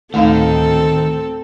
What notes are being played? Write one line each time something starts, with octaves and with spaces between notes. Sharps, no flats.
D2 A2 D#3 A3 C4 D#4 A4 F5